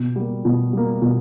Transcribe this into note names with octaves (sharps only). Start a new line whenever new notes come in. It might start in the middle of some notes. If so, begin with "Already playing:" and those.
Already playing: B2
G3 A#3
B2
G3 A#3
B2